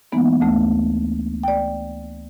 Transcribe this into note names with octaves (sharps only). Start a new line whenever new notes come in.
E3 G#3 A#3 B3 D#4
D2 A3
D5 G5